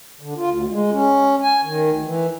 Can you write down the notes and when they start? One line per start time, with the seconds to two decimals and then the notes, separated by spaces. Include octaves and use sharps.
0.21 D3
0.37 F4
0.50 D2
0.69 G#3
0.91 C#4
1.43 G#5
1.64 D#3
1.91 D2
2.04 E3